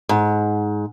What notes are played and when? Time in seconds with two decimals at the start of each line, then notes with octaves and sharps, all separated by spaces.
0.09 G#2